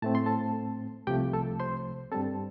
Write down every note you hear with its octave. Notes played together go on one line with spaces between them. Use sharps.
A2 A3 C4 A5
C6
A4 A5
C2 C3 F3 A3 G4 G5
A4 A5
C5 C6
G2 G3 C4 A4 A5